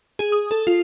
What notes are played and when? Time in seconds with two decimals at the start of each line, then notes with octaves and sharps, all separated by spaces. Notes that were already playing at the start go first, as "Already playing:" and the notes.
0.19 G#4
0.32 D#6
0.51 A4
0.67 F4